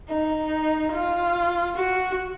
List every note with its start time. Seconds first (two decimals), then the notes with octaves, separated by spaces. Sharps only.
0.10 D#4
0.93 F4
1.76 F#4